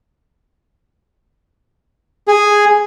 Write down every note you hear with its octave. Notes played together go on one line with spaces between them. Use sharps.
G#4